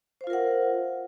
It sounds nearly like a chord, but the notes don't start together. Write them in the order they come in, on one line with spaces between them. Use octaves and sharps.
C5 F5 F4 A#4 F#5